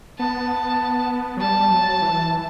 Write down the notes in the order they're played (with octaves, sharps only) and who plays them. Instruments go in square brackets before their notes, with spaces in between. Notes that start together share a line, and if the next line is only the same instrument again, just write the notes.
[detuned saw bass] B3 [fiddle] A5
[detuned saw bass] F#3
[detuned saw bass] G3 [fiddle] A5
[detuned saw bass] G3
F#3
E3